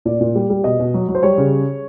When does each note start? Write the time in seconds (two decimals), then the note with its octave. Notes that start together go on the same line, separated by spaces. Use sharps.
0.05 A#2 D5
0.21 A#2
0.35 G3
0.50 G3
0.64 B2 D#5
0.80 B2
0.94 F#3
1.08 F#3
1.15 C5
1.23 G3 C#5
1.38 C#3